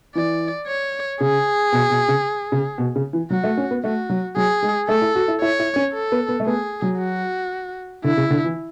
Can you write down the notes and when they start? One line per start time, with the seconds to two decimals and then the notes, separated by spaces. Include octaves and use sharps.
0.15 E3 D5
0.67 C#5
1.20 C#3 G#4
1.72 B2
1.90 B2
2.08 C#3
2.52 C#3
2.78 B2
2.96 C#3
3.13 E3
3.30 F#3 F#4
3.44 A3
3.57 C#4
3.71 B3
3.84 A3 F#4
4.10 F#3
4.36 F#3 G#4
4.62 G#3
4.88 A3 A4
5.02 E4
5.15 F#4
5.28 E4
5.41 E4 C#5
5.60 E4
5.76 C#4
5.94 A4
6.12 B3
6.29 B3
6.40 A3
6.47 B3 G#4
6.82 F#3
7.00 F#4
8.04 D3 E4
8.17 C#3
8.30 D3
8.44 E3